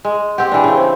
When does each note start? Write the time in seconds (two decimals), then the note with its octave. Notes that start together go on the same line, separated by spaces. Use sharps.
0.05 G#3
0.38 C4 G4 F#5
0.52 E3 D4
0.64 C#3 C4
0.77 C5